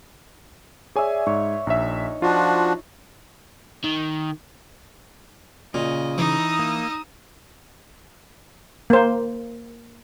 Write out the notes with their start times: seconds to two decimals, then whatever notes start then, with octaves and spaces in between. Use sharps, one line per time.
0.96 G#4 C#5 D5 E5 G#5
1.27 G#2 C#5
1.67 A#1 D#4 E5
2.22 F3 D4 F4 F#4
3.84 D#3
5.74 A#2 C#3 D#5
6.18 E3 D#4 D#5 D#6 E6
6.59 A#3
8.90 A#3 C5